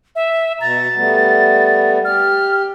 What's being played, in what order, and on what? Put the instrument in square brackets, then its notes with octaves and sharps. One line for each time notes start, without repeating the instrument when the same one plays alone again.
[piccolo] E5
[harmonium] B2 A#5 [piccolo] A6
[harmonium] G3 A3 B3
[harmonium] G4 [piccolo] F6